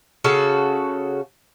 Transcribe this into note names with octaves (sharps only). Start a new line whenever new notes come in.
C#3 F#4 A4